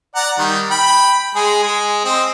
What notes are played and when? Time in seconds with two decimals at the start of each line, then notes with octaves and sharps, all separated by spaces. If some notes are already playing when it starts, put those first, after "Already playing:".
0.15 D5 F#5 A#5
0.39 D#3 G3
0.71 G5 B5
1.35 G#3 G#4
1.63 G#3 G#4
2.05 C4 D#5